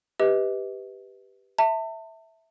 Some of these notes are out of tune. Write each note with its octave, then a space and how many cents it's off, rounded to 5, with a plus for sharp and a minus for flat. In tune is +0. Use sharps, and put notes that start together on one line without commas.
G4 +0 B4 +0 D#5 +35
E5 -10 A5 +35